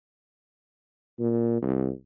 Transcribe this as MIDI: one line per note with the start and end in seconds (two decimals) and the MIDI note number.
1.19 1.58 46
1.62 1.90 36